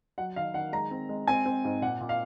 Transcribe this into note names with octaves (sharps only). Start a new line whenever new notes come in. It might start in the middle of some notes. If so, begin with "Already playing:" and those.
F#3 F#5
D#3 F5
D#3 F#5
G#3 A#5
C4
G#3
C4 G#5
C4
G#2
A#2 F#5
A#2
F5